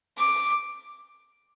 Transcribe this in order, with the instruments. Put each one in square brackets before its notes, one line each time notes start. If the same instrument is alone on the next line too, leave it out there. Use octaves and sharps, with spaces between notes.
[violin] D6